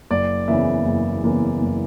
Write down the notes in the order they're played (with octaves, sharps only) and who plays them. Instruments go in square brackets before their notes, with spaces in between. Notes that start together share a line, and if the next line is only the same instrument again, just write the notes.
[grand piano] F#1 D5
E2 C#3 E3 A#3 E5
F#1
E2 C#3 E3 A#3
F#1